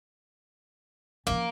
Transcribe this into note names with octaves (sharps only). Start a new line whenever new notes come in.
F3 A#3 C#4